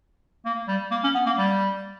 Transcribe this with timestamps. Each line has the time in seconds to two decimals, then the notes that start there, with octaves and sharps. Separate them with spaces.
0.46 A#3
0.68 G3
0.91 A#3
1.04 C#4
1.15 B3
1.26 A#3
1.38 G3